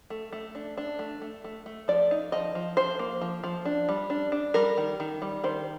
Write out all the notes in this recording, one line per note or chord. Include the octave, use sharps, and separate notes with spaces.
A3
A3
D4
D4
A3
A3
A3
A3
F3 D5
D#4
F3 D#5
F3
F3 C5
A#3
F3
F3
D4
G3
D4
D4
G3 A#4
D#3
D#3
G3
D#3 C5